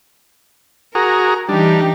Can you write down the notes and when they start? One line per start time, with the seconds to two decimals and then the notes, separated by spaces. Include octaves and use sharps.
0.95 F#4 G#4 A#4 A#5
1.49 E3 G3 D4 D#4 G4